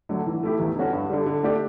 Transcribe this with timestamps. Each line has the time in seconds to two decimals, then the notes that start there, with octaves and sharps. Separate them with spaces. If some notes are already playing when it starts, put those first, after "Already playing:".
0.09 D3 F#3 A3
0.27 E3
0.43 A3 E4 G4
0.60 E2
0.76 D3 G3 C#4 F#4
0.93 G2
1.10 D3 G3
1.26 D3
1.43 A3 D4 G4